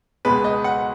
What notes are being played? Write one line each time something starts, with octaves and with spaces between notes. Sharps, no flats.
C#2 B2 G#3 B4
D#5
F#5